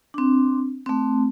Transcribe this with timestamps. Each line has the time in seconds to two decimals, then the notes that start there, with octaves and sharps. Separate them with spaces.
0.14 C4 D4
0.86 A3 C4